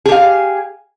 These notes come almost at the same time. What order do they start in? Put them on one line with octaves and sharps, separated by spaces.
G#4 G4 F5